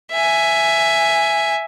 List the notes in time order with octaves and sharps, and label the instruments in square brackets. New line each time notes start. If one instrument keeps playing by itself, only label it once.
[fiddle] E5 G#5